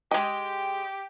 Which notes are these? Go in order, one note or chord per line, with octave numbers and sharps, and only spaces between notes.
G#3 G4 D#5 G5